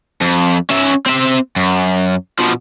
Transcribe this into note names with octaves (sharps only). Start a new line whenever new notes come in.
F2
C#4 E5
C4 E5
F#2
B2 F3